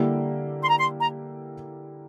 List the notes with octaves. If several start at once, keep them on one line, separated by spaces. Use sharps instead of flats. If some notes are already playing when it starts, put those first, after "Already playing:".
Already playing: D3 G3 A#3 E4 G4
C6
A#5
C6
A#5